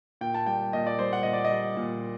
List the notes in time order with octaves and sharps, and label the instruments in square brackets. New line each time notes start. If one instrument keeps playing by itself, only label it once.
[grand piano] A#2 G5
A5
G3 G5
A#2 D#5
D5
G3 C5
F#5
A#2 D#5
D5
D#5
G3
A#2